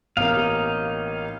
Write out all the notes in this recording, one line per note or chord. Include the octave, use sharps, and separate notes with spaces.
A1 A#3 B3 D#4 F5
G4